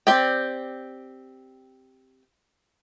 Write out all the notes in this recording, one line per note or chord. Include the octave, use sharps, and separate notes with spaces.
C4 G4 D5 G5